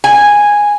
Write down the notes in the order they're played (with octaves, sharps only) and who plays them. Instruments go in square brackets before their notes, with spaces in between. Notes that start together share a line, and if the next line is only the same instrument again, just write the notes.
[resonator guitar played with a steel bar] G#5